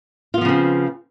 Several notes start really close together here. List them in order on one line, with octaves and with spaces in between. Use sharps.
F4 B3 F3 C#3 C4